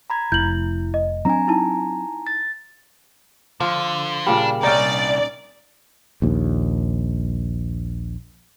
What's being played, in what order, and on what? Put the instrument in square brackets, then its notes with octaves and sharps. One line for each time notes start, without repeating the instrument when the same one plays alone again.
[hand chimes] A#5 B5 G#6
[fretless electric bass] F1 [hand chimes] E4 [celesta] G6 F#7
[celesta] D#5
[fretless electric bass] F#3 C4 D4 [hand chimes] G#5 A#5
[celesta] D#4 E4 A5
[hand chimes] A6
[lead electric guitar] D3 [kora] F3
[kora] A#2 C#3 G3 [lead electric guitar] D4
[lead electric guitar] C2 [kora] C#4 D#4 [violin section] D5
[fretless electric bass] A#1 D#2